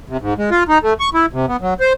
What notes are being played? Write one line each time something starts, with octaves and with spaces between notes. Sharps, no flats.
C3
G#2
G#3
F4
D#4
A3
C#6
E4
C3
B3
F#3
C5